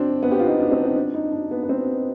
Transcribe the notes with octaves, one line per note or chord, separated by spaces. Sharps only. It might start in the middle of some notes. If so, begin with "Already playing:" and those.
Already playing: C4 D4
B3
G4
F4
D#4
D4
C4
D#4
D4
D#4
D4
B3
B3
C4